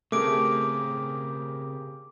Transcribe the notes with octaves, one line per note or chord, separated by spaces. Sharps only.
C#3 A3 C4 G4 G#4 A#4 D6 D7